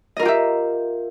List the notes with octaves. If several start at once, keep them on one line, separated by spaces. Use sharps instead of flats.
F4 G4 A#4 D#5 E5